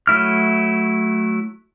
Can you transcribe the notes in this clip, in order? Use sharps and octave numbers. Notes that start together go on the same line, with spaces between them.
F#3 A3 E4 F6